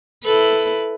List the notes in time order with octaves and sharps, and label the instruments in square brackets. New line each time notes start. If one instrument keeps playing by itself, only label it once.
[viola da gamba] E4 A4 B4